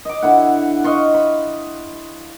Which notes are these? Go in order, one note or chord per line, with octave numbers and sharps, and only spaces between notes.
D#5 D6
D3 E4 F#5
D#5 F5 C6 C#6
B5